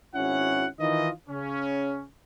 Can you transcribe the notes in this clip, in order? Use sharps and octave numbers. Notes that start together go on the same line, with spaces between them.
G#1 C#4 E4 F#4 F#5
D#3 E3 D#4 F4 D#5
C#3 C#4